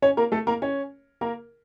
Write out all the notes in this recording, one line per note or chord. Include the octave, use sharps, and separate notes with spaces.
C#4 C#5
A#3 A#4
A3 A4
A#3 A#4
C#4 C#5
A#3 A#4